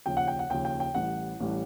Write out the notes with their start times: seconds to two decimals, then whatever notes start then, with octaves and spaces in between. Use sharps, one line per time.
0.06 D#2 C#3 F3 G5
0.17 F#5
0.28 G5
0.39 F#5
0.50 D#2 C#3 F3 G5
0.65 G5
0.80 G5
0.95 A1 A2 E3 G3 F#5
1.40 A1 A2 E3 G3